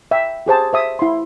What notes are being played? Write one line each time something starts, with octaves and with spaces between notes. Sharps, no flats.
E5 G5
G4 G#4 C5 A5
C5 E5 D#6
E4 C6